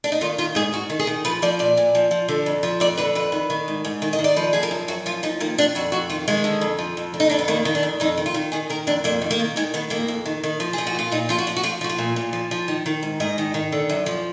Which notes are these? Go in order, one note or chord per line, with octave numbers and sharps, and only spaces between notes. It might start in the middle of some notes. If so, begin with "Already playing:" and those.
D4
D#4
D#3 F4
D#3 F4
G#2 G#4
G#2 F#4
D#3
G#4
D#3
F3 B4
F3 D5
A#2 D5
A#2
F3
F3
D3
F2
F3
F2 D5
D3 B4
F2 B4
D#3
D#3
G#2
G#2
D#3
D#5
D#3
D5
F3 B4
F3 G#4
A#4
F#2
F#2 F#4
F3 F4
F3 D#4
D#3 A#3
D#3 D4
F2 F#4
F2 F#4
D#3 F4
D#3 G#3
D3
F2
F3
F2
D3
D#4
F2 D4
B3
D#3 A#3
D#3
D4
F2
F2 D#4
D#3
F4
D#3
D#3 G#4
D#3 A#4
F2 D4
F2 A#3
D#3
A#3
D#3
D#3 G#3
D#3 B3
F2 A#3
F2
D#3
D#3
F3
F3 G#4
F#4
A#2 F4
A#2 D#4
F3 F4
F#4
F3 F4
F#4
F3 F4
F3 F#4
F4
A#2
A#2
F3
F3
D#3
D#3
G#2
G#2 D#5
D#3
D#3
D3
F#2
F3